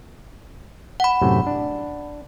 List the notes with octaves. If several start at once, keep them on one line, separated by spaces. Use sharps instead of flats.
F#5 B5
F#2 A2 C3
D4